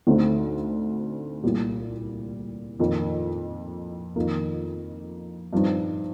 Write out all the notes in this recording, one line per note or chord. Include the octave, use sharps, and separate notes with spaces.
D2 D3 A3 C4 D#4
C2 A#2 G3
F2 D#3 A#3
F2 D#3 A#3
G2 F3 C4 D#4